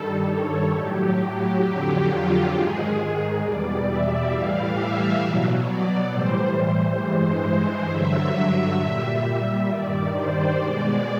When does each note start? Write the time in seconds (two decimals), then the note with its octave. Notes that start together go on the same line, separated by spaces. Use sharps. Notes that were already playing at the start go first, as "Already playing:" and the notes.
Already playing: G2 D#3 G3 A4
0.28 C#5
0.73 A2 F#3 G4
1.17 G4
1.62 F2 D3 F#3
2.07 F4
2.51 G#2 D#3 G#3 G#4
3.41 E2 B2 G3 D5
3.86 E5
4.30 A2 E3 G3 F5
4.75 E5
5.21 B2 F#3
5.65 D5
6.09 A2 E3 G3 C5
6.99 G2 E3 G#3
7.88 G2 D3 F#3 E5
8.78 A#2 G3
9.23 E5
9.67 G2 D#3 G3 D5
10.13 C5
10.57 B2 G#3 D5